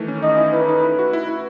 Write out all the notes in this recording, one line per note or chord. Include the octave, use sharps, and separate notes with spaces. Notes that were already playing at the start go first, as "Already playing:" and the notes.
Already playing: D#3 E3 A3
C#4
D#4 D#5
E4
E4 B4
D#4
E4
F#4
E4
E4